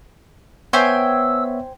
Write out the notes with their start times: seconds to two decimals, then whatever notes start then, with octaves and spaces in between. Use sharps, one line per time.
0.73 B3 C5 C#5 E5 G5 G#5 E6